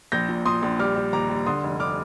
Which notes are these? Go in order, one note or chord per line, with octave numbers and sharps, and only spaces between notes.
A#1 G6 A#6
A#2
A#2 C6 D#6
A#1
G3 D6 F6
G3
D#2 A#5 D6
G3
D3 C6 D#6
F1
D3 D6 F6